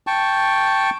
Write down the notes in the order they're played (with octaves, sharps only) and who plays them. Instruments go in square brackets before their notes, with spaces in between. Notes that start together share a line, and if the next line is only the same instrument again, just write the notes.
[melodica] G5 A5 C#6